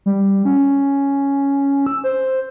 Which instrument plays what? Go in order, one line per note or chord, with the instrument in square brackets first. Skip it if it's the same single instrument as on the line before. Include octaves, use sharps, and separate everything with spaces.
[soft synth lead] G3
C#4
E6
C5